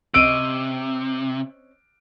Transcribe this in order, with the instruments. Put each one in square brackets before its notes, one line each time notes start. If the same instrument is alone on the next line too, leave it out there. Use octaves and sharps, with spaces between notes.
[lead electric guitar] C3 [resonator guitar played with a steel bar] C4 C#4 D#5 [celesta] E6 D#7 [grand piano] D7